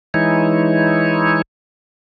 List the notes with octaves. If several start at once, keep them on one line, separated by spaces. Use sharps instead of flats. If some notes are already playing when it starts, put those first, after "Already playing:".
E3 G#3 D#4 E4 C#5